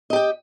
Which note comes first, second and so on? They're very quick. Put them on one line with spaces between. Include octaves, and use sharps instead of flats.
D#5 G4 G5